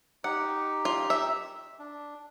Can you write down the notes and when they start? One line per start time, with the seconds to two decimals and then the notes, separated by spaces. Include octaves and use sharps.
0.24 D#4 G4 F#5
0.85 F4
1.10 E5
1.79 D4